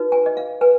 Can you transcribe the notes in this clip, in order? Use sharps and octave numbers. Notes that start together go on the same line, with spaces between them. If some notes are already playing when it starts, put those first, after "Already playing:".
Already playing: D#4 F#4 B4
G#5
D#5
F5
B4 G#5